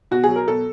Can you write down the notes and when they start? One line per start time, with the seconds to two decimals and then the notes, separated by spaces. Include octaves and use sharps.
0.11 B2 F#4
0.24 F#3 G#4
0.36 A#4
0.47 B2 A4